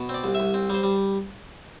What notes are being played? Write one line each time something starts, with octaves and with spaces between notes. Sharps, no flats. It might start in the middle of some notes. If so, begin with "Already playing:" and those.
Already playing: B2
C4 D5
C2
C2 E5
C4
G3 C5
G3